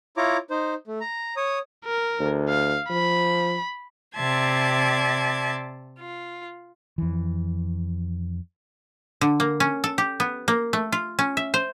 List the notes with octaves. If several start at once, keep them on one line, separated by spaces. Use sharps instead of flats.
E4 F4 C#5 A#5 D6
D#4 C5
A3
A#5
C#5 D#6
A#4
D2
F5
F3 B5
C3 D5 E5 A5 C6 G#6
F4
F2 E3
D3
A#3
C#4
A4
G4
B3
A#3
A3
F4
C#4
E5
C5